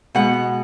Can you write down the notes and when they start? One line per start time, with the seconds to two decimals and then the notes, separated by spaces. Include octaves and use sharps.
0.15 B2 G#3 B3 F#5